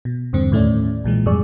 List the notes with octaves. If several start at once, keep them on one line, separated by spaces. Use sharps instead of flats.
B2
E2 G2 D3 C4
D#2 A2 A3 C#4 D5
B1 A#2 E3 G#3
F2 G#2 G3 G#4 D5 C#6